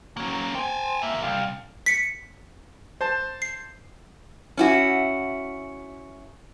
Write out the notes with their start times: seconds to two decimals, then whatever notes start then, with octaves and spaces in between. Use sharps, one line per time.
0.17 F#3 A#3 C#4
0.55 C5 G5 G#5
1.02 G#2 A#3 E5
1.23 C2 F5
1.86 B6 C#7
3.01 C5 A5
3.42 C7
4.57 C#4 E4 F#4